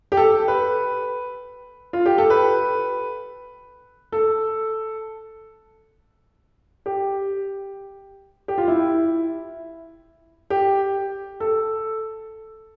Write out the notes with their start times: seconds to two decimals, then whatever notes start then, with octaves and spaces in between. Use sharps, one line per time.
0.12 G4
0.17 A4
0.48 B4
1.93 F4
2.06 G4
2.18 A4
2.30 B4
4.12 A4
6.86 G4
8.48 G4
8.58 F4
8.68 E4
10.50 G4
11.40 A4